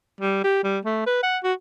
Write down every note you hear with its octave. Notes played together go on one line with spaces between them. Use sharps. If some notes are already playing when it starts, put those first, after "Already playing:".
G3
G4
G3
A3
B4
F#5
F#4